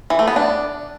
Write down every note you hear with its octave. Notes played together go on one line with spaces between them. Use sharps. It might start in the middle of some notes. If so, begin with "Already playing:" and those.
E3
A3
B3
D4